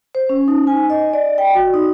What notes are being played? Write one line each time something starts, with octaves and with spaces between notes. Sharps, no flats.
C5
C#4
D#4
G#5
D#5
D5
G5
F#4
D#4